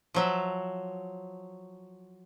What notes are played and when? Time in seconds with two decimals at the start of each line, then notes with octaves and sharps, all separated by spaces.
0.14 F3 F#3 E5